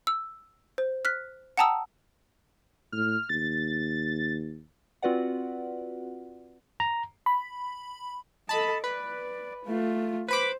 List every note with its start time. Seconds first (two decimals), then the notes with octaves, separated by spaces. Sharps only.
0.07 E6
0.78 C5
1.05 F6 F#6 B6
1.57 F#5 G5 A5 A#5 D#6 E6
2.92 A2 F6
3.29 D#2 A6
5.02 C4 F4 F#4 B4 D5 F#5
6.80 A#5
7.26 B5
8.49 A4 D#5 A5 B5
8.84 B4 D5
9.65 A3 F4
10.28 B4 C5 B5 D6